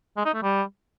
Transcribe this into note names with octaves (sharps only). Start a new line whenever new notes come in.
G#3
D#4
A3
G3